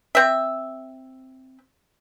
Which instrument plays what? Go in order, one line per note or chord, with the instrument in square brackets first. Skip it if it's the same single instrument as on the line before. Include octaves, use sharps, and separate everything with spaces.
[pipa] C4 E5